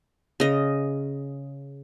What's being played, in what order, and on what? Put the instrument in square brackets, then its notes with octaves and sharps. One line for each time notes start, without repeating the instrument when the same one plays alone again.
[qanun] C#3 D#5